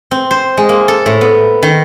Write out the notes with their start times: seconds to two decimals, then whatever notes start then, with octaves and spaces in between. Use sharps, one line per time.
0.11 C4
0.31 C5
0.57 G#3
0.69 A#3
0.88 A4
1.06 A2
1.21 B3
1.63 D#3